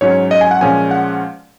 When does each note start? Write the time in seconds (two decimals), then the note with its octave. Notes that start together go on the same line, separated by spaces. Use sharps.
0.01 G#2 F#3 C#4 C#5
0.31 D#5
0.41 G#5
0.51 F#5
0.61 A#2 F3 G#3 C#4 G#5
0.91 F#5